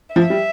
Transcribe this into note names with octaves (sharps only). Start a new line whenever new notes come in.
F3 E5
G3